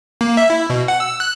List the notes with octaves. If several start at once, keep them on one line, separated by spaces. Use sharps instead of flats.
A#3
E5
E4
B2
F#5
E6
F#6